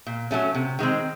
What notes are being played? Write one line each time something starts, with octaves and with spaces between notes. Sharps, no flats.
A#2
F#3 A3 C#4
C3
D#3 G#3 C4